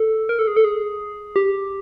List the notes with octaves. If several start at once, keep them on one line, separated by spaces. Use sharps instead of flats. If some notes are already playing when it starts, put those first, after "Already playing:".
Already playing: A4
A#4
A4
G#4
A4
G#4
G4